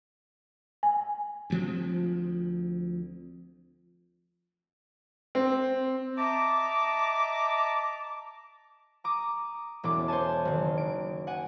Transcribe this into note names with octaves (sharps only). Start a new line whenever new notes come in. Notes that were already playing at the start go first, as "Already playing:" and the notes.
G#5
D2 F3 C4
C4
D#5 E5 A5 A#5 D6
A#5 D6 D#6
E1 C#4 D4 D6
C5 C#5 G#5 A5
F#1 D#3
D7
F#5 G#5